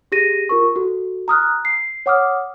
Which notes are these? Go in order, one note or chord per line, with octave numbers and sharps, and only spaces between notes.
G4 G#4 A#6 D#7
F4 A#4 C#6
F#4 A4
A#5 D#6 F6 F#6
C7
C#5 F#5 D6 D#6 F6